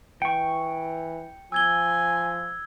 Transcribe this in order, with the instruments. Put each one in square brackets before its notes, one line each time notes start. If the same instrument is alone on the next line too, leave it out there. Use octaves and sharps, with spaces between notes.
[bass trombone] E3 [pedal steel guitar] G5 C#6 [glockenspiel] C#7
[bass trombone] F3 [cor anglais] G#5 [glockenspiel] E6 G#6 G7